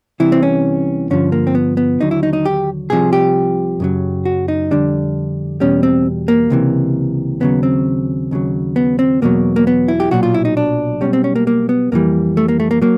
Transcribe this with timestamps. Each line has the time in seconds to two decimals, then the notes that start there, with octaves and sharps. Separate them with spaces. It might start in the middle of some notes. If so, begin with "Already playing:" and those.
0.20 C2 C3 E3 E4
0.32 C4
0.43 C#4
1.10 G2 D3 F3 C#4
1.32 A#3
1.47 C4
1.55 B3
1.77 B3
2.00 D#2 D3 F#3 D#4
2.11 E4
2.23 D#4
2.33 D#4
2.45 G4
2.90 C2 C3 F3 G#4
3.13 G4
3.80 F#2 C#3 F#3
4.25 F#4
4.48 D#4
4.71 F2 D3 G3 D4
5.60 E2 B2 G3 C#4
5.83 C4
6.28 A#3
6.50 C#2 C3 E3
7.40 D#2 C#3 F#3 B3
7.63 C4
8.31 D#2 C#3 F#3
8.76 B3
8.99 C4
9.22 E2 B2 F#3 A#3
9.56 A#3
9.67 B3
9.88 E4
10.00 G4
10.11 B1 A#2 F#3 F#4
10.23 F4
10.34 E4
10.45 D#4
10.57 D4
11.01 B1 B2 G3 C#4
11.13 C4
11.24 C#4
11.36 A#3
11.47 A#3
11.69 B3
11.92 F2 C3 E3 G3 A#3
12.37 A3
12.48 A#3
12.60 A3
12.71 A#3
12.82 F#3 A#3